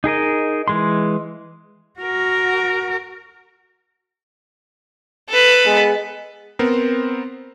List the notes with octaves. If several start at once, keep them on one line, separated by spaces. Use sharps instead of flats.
D#4 G#4 A#4 D#5
E3 G#3 C6
F#4 A#4
A4 B4
G#3 B3
B3 C4 A#4 C5